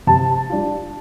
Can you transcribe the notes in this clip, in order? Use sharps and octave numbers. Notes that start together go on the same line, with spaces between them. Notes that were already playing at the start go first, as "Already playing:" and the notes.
C3 A5
G3 D4 F4